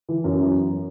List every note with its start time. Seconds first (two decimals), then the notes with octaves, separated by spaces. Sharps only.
0.09 E3
0.24 F#2
0.38 F#3